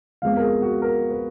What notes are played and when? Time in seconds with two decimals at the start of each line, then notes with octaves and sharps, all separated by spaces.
0.22 F2 F3 G#3 B3 F5
0.37 A#4
0.42 G#4
0.62 F#4
0.82 A#4
1.11 B4